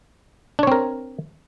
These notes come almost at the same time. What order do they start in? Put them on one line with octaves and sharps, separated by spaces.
D4 C#5 C4 A#4